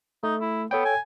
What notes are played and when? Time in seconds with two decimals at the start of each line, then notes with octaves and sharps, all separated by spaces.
0.23 A3 D#4
0.41 E4
0.71 B3 A4 C#5 G5
0.85 G#5